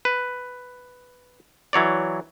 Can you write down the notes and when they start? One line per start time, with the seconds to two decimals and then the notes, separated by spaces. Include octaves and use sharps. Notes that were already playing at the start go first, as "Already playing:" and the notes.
0.05 B4
1.73 E3 F#3 C#5 D5